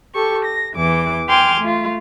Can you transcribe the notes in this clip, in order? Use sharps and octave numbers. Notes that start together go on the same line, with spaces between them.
G4 A4 C#6
A#6
E2 E3 D6
G5 G#5 C6 D6 F6
A3 F4